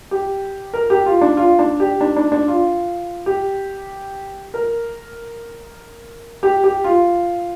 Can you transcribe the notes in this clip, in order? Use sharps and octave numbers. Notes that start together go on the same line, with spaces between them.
G4
A#4
G4
F4
D4
F4
D4
G4
D4
D4
D4
F4
G4
A#4
G4
G4
F4